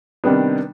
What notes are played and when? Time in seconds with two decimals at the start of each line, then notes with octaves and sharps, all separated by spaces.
0.24 C3 D#3 G3 B3 D4